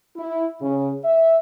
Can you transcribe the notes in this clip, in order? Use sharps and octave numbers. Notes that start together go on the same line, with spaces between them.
E4
C#3
E5